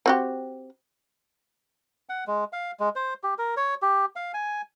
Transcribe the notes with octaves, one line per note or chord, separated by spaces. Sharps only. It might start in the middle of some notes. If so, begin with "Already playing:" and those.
C4 F#4 G4
F#5
G#3
F5
G#3
C5
G4
A#4
C#5
G4
F5
G#5